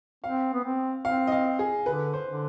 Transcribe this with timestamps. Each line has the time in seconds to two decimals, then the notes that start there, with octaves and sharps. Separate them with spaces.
0.24 C4 F5
0.54 B3
0.65 C4
1.05 C4 F5
1.27 D#5
1.32 F5
1.59 G#4
1.86 D3 B4
2.13 C5
2.26 D3